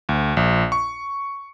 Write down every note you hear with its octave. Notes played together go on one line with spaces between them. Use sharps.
D2
A#1
C#6